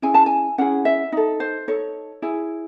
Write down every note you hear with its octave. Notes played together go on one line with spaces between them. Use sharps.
C#4 E4 G#4 G#5
A5
G#5
C#4 E4 G#4 F#5
E5
D#4 A4
C5
D#4 A4 C#5
E4 G#4